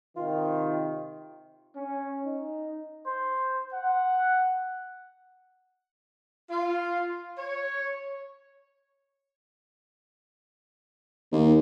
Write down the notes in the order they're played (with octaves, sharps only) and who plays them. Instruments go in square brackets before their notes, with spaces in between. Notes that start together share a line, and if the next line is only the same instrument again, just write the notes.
[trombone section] C3 D#3 [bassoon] F4
[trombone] C#4
D#4
[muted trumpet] C5
F#5
[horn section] F4
C#5
[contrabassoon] D#2